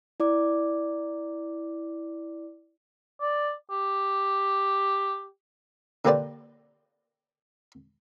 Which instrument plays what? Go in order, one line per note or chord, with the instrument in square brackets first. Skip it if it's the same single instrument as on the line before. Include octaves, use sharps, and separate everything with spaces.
[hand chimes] E4 D5 D6
[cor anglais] D5
G4
[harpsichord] D3 A#3 G4 B4 C5 D5